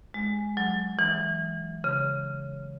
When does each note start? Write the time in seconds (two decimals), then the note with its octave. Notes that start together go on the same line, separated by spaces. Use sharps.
0.14 G#3
0.57 F#3
0.99 E3
1.84 C#3